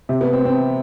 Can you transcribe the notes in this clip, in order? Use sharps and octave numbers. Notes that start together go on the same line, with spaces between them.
C3
B3
C4
C4